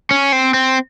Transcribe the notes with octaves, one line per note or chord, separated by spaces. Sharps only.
C#4
C4
C4